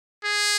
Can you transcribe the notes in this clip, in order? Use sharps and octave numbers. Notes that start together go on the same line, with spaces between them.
G#4